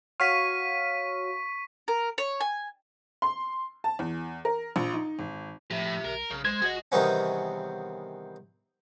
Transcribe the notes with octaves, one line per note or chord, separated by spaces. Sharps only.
F#4 C#5 F5 C#6 B6 D#7
A#4
C#5
G#5
C6
A5
E2
A#4
A#1
D#4
G#1
A2 F3 G4 E5
B1 A#4
B1 C#3
G#3 C5 G#6
E1 F#4 G#4 D#5
E2 C3 D#3 G3 B3 C#4